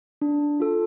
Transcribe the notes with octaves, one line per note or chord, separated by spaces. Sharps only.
D4
F4 A4